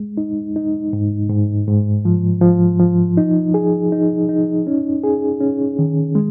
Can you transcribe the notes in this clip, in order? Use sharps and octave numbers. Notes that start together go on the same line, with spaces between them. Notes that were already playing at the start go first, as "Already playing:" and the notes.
Already playing: G#3
D#4
D#4
G#2
G#2
G#2
F3
F3
F3
D#4
G#4
D#4
D#4
C#4
G#4
C#4
D#3
G#3